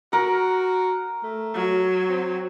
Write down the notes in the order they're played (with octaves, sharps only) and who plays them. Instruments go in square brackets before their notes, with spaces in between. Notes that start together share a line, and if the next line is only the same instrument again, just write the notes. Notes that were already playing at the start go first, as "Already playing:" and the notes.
[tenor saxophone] F#4 [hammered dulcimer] A#4
[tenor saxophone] A3
[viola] F#3
[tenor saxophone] C4